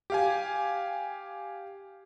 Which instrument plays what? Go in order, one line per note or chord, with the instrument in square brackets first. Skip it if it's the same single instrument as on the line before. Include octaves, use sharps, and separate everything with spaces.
[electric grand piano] G4 F5 G#5